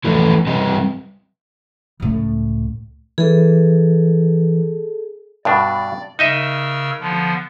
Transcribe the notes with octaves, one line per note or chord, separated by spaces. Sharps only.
E3 F3 A3 B3 E4
G3 C4 B4 D#5
C#2 A2
E3 G#4 A4
G2 B2 D4 D5
C#3 D#4 A#4 D#5 E5 E6
D3 F3 B3